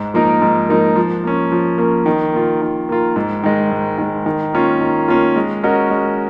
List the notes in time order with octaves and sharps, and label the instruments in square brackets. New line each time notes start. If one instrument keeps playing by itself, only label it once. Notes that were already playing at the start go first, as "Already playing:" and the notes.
Already playing: [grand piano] G#2
F3 A#3 D#4 A#4
G#2
F3 A#3 D#4 A#4
F3
A#3 C#4
F3
A#3 C#4
D#3
A#3 F4
D#3
A#3 F4
G#2
D#3 G#3
G#2
D#3 G#3
D#3
A#3 C#4 F4
D#3
A#3 C#4 F4
G#3
C#4 F#4 A#4 D#5
G#3